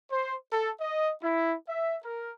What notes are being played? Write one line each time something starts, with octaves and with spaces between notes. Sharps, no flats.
C5
A4
D#5
E4
E5
A#4